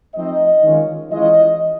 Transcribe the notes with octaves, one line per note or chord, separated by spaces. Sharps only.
F3 A3 C4 D#4 D#5
D#3 G#3 C#4 F4
E3 G#3 C#4 F4 D#5